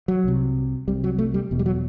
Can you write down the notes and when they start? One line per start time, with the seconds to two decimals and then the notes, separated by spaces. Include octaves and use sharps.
0.08 F#3
0.24 C2 C3
0.88 C2 C3 G3
1.04 F#3
1.19 A3
1.34 G3
1.51 E1 E2 B2
1.59 G3
1.66 F#3